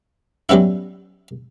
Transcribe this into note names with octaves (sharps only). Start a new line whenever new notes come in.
F#3 G3 B3 C#4 E4